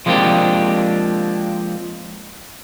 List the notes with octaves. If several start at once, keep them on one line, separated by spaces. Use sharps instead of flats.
F3 G#3 A#3 C4 D4 G4